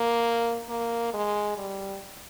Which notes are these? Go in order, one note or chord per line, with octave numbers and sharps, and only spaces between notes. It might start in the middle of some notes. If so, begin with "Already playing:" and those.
Already playing: A#3
A#3
G#3
G3